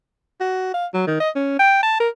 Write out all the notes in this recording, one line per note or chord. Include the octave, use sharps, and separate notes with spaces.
F#4
F5
F#3
D#3
D#5
C#4
G5
A5
A#4